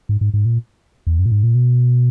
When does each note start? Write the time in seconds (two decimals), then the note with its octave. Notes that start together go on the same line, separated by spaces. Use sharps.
0.09 G#2
0.21 G#2
0.34 G#2
0.45 A#2
1.07 E2
1.19 F#2
1.25 A#2
1.31 G#2
1.43 A#2
1.55 B2